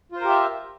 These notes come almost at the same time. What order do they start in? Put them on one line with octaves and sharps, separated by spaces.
F4 C5 A#4 G4 E5